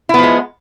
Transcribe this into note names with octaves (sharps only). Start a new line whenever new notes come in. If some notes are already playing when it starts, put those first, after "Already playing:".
F3 G#3 B3 E4